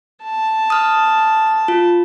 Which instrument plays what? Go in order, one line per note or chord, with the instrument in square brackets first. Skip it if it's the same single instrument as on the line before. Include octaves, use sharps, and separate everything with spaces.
[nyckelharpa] A5
[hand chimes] D#6 F6
F4